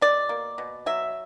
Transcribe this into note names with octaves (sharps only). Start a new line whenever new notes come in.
B2 D5
A#3
B2
F#3 E5